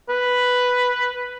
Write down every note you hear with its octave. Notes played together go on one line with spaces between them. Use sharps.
B4